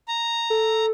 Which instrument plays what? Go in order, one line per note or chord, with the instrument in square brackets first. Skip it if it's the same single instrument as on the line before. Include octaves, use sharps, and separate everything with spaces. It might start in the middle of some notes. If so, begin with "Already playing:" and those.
[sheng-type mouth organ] A#5
[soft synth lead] A4